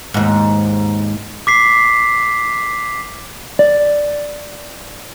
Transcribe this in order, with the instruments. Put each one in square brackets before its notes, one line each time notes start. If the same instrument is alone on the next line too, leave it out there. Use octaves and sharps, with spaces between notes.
[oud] D#2 G#2
[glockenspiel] D6 B6 C7
[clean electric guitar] D5